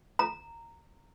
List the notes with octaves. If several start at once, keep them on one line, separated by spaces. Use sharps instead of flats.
A#5